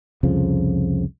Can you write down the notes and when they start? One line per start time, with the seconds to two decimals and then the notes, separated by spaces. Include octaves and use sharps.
0.23 C2 F2 C#3 F3